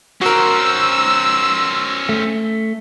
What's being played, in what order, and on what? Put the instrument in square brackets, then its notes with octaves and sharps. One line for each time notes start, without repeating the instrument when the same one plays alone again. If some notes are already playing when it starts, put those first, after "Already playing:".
[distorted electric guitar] C#4 C5 [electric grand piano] F#4 A#4 [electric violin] E6
[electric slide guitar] A3